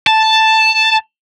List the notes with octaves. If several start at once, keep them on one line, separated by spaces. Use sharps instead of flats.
A5